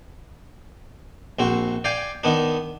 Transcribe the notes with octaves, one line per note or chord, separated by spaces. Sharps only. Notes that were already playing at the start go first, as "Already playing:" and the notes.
A#1 C4 F#4
D5 F5 G5 G#5
D#3 B3 D4